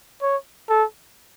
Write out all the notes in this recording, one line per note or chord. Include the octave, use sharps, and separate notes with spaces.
C#5
A4